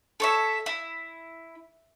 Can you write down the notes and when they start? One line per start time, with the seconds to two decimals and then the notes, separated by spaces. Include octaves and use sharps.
0.20 A4 C#5 E5
0.66 E4